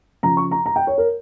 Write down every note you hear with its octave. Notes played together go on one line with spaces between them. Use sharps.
C#3 F3 A#5
C#6
A#5
A#5
G5
C#5
A#4